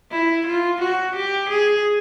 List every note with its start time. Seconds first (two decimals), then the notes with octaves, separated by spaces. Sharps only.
0.11 E4
0.47 F4
0.82 F#4
1.16 G4
1.49 G#4